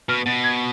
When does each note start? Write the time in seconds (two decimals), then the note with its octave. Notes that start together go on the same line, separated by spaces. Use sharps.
0.09 B2 F6
0.26 B2 A6
0.44 G#6